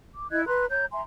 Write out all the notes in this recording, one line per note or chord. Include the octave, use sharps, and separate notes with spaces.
D6
E4 D#5 F#6 G#6
B4 A#5 C6 F#6
C#5 A#5 G6
E5 G#5 A#5 C6